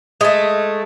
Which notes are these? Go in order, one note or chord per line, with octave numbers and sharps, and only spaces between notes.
G#3 A3